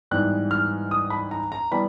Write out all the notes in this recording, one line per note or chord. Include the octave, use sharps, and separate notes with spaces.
G#2 E3 G3 B3 F#6
F6
D#6
B5
A#5
A#5
E3 G3 B3 B5